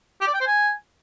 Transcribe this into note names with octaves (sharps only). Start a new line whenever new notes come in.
G4
D5
G5
C5
G#5